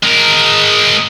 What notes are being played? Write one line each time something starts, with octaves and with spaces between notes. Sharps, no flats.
G#3 A#4